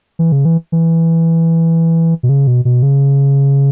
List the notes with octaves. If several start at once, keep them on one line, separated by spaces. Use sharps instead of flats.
E3
C#3
E3
E3
B2
C#3
B2
B2
C#3